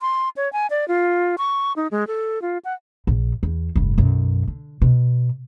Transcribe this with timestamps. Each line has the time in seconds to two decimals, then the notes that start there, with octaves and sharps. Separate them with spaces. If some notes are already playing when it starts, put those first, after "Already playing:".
0.01 C6
0.37 C#5
0.53 G#5
0.70 D5
0.88 F4
1.38 C#6
1.76 D#4
1.91 G#3
2.07 A4
2.42 F4
2.65 F#5
3.07 A#1
3.43 E2
3.76 F1 G2
3.98 B1 F#2
4.48 D3
4.82 B2